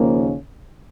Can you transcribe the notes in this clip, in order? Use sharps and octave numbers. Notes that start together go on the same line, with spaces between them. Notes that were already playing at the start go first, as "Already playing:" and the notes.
Already playing: D#2 C#3 F3 A#3